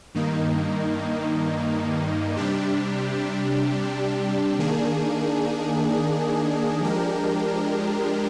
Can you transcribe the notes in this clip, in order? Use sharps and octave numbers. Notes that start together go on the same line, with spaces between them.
G2 D#3 A#3 D#4
C3 G3 D4 G4
D#3 A#3 D4 G#4
F3 G#3 D4 G4 A#4